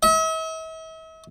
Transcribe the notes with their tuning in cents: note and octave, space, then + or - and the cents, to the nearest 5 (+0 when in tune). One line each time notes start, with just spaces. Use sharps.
E5 -45